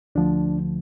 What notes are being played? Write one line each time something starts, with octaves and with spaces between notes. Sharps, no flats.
D2 D3 F3 A3 D4